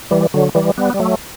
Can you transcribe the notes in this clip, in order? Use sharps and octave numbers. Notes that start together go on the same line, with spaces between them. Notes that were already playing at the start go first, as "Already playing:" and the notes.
E3 G3
D3 F#3
E3 G3
G3 B3
G3
F#3 A3